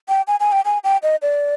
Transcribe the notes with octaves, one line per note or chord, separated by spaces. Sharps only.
G5
G#5
G#5
G5
G#5
G5
D#5
D5